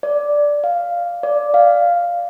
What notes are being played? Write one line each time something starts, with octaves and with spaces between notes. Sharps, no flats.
D5
F5
D5
F5